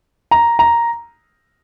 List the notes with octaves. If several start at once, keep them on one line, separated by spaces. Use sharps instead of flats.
A#5
A#5